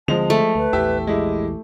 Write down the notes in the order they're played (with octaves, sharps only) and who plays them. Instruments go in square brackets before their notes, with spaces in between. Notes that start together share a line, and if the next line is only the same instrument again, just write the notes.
[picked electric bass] D2 D3 C4 [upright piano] F3 G#3 F7 [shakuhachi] A5
[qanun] A3
[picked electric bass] D2 [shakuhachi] B4
[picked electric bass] A#1 E2 E3 [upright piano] G4 E5
[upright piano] G#3 E4 [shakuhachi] G4